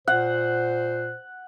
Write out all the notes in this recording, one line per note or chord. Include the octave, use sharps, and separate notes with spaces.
A#2 C5 F#5